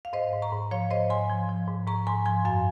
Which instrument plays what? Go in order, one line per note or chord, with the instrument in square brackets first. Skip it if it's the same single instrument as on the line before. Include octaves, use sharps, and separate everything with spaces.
[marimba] F5
G#2 C5 D#5
G#2
A#5 C#6
G#2
F3 C#5 F5
G#2 C5 D#5
G#2 G#5 C6
F3
F3
G#2
G#2 A#5 C#6
G#2 G#5 C6
F3 G#5 C6
F#2 F5 G#5